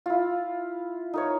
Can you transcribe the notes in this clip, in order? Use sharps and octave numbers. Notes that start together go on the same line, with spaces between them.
E4 F4
D#4 A#4 C#5